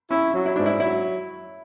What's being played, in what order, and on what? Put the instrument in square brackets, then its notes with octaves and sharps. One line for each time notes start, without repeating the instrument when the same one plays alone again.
[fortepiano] C#4 [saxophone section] E4
[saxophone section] F#3
[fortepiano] E4
[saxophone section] G#2 [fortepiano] D4
[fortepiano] E4
[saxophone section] F#3 [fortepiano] E4